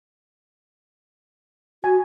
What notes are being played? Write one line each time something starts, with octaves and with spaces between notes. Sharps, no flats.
F#4 G#5